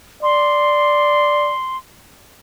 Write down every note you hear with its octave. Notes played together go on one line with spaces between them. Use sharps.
D5 C6